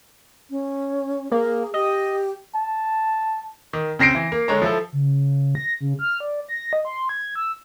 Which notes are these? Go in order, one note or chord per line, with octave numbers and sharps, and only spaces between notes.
C#4
A#3 G#4
G4 D#5
A5
D#3
C#3 C4 A#6 C7 D7
E3
A#3
D3 G#3 C#5 A#5
F3 E4 A4
C#3
A#6
C#3
F6
D5
A#6
D#5
C6
G#6
E6